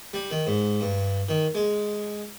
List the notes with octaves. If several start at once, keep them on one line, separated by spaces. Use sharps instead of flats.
G3
D#3
G#2
G2
D#3
G#3